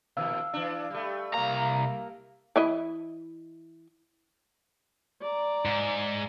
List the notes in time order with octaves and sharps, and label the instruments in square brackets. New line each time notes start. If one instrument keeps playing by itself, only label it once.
[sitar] A#2 D#3 F3 [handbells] F5 E6
[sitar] E3 D4
G3 A3
[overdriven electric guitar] C2 A#5 [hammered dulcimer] A#3
[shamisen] E3 E4 D#5
[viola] D5 A#5
[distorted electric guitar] G#2